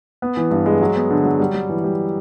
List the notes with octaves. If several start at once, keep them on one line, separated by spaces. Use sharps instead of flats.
B3
E3
G2
G#3
F#3
B3
D3
F#3
G3
G3
E3
G3